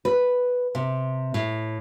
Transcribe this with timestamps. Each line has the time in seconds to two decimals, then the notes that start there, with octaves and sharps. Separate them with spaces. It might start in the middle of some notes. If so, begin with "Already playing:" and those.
0.05 B4
0.75 C3
1.34 A2